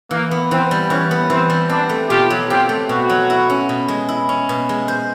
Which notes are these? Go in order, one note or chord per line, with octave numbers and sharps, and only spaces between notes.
E3 A#3
B3
E3 C4
G3
E3 C#4
B3
E3 C4
G3
C4 D4
A3
B2 F4 G4
F#3
C4 F4 G4
A3
B2 F#4
F#3
E4
C#4
B2
G#3
E4
C#4
B2
G#3
C5